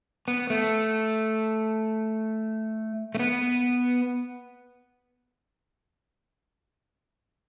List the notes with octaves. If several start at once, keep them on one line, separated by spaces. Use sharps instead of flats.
B3
A3
A3
B3